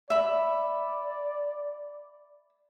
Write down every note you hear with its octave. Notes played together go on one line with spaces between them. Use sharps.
D5 E5 B5